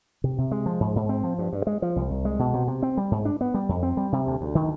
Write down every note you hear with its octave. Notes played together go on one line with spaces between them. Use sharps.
C3
C3
G#3
F3
G#2
G#2
C4
F3
G2
G2
G#3
F3
C2
C2
G#3
B2
C3
C3
C4
G3
G#2
D4
B3
G3
F2
C4
G3
C3
D2
D2
D#3